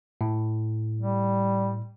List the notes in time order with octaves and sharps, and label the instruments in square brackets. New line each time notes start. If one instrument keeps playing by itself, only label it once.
[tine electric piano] A2
[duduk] G3